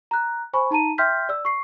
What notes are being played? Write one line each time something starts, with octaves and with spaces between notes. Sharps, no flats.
A#5 F#6
C5 G#5 B5 C#6
D#4 A5 A#5 D#7
E5 G5 C6 F6 G6 B6
D5 E6
C#6 C7